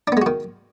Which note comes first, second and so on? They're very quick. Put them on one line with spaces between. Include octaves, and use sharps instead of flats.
D4 B3 G#3 F#4 D#3